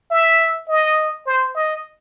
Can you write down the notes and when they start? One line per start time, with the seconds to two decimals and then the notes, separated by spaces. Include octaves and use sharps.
0.11 E5
0.68 D#5
1.26 C5
1.55 D#5